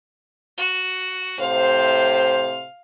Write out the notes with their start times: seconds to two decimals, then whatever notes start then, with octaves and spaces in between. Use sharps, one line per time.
0.57 F#4
1.39 A2 C3 C5 F5